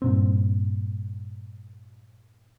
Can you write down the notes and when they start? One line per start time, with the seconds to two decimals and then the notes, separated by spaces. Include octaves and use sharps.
0.02 G2 A#2 C4